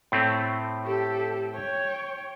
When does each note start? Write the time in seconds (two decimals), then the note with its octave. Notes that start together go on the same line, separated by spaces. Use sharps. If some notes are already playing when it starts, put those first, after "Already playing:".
0.12 A2 A3 C4
0.84 G4 A4
1.51 C#5 G5